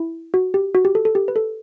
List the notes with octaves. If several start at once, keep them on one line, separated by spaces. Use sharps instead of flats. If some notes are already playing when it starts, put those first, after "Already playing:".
Already playing: E4
F#4
G4
F#4
G4
A4
A4
G4
B4
A4